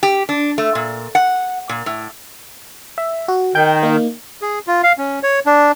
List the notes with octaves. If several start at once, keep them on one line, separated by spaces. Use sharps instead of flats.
G4
D4
A3
A#2
F#5
A#2
A2
E5
F#4
D#3 G5 G6
A#3 D#4
G#4
F4
F5
C#4
C#5
D4